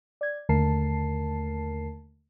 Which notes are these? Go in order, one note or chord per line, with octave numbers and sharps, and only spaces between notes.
D5 G#6
D#2 D3 A3 A#4 A5 C7